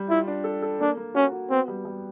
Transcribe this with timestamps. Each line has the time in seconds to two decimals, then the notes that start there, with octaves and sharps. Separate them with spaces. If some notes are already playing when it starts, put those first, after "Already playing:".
Already playing: G3
0.10 E4 F4
0.28 D4
0.44 A4
0.62 A4
0.80 A#3 D4
0.97 A#3
1.14 C#4 F#4
1.32 F#4
1.50 B3 C4
1.68 G3
1.85 G3